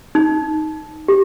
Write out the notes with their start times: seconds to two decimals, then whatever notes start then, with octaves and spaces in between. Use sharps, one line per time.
0.15 D#4
1.08 G4